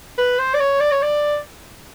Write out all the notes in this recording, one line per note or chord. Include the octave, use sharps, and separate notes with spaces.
B4
C5
D5
C#5
D5
C#5
D5